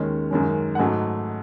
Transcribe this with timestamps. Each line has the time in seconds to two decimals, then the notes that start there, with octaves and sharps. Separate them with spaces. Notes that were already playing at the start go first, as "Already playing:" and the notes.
Already playing: D#2 D#3 G#3 C#4
0.31 F#2 D#3 G#3 C#4
0.75 F#5
0.79 G#2 F#3 A3 D#4 G#5